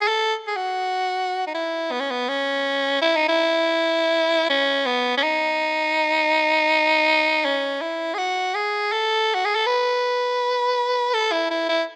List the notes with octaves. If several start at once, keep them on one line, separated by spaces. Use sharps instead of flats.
G#4
A4
G#4
F#4
D#4
E4
B3
C#4
B3
C#4
E4
D#4
E4
C#4
B3
C#4
D#4
C#4
E4
G#4
F#4
G#4
A4
F#4
G#4
A4
B4
A4
E4
E4
E4